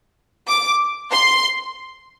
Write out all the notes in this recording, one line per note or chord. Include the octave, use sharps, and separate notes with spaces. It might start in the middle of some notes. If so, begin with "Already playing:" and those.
D6
C6